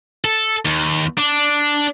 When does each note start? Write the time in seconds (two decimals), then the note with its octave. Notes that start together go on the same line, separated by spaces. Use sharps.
0.24 A4
0.65 D#2
1.18 D4